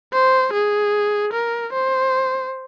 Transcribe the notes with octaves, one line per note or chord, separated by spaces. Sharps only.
C5
G#4
A#4
C5